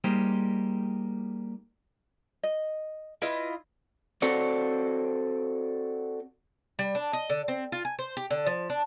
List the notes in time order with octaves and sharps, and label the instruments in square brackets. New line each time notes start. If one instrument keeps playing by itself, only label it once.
[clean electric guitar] G3 A#3 D#4 G4 G#4 C5
[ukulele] D#5
[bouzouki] E4 F4 D#5 [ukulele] B4
[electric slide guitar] C4 F#4 A4 C#5 D5
[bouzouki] G3
D4
D#5
D3
C4
F4
G#5
C5
G4
D3
F3
D4